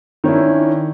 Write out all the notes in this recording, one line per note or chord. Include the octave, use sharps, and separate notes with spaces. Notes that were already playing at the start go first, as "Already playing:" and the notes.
D#3 C#4 D4 E4